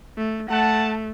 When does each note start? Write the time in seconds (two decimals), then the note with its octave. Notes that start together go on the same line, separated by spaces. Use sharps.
0.18 A3
0.49 A3 F#5 A5